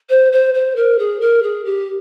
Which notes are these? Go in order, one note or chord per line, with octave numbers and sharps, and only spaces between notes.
C5
C5
C5
A#4
G#4
A#4
G#4
G4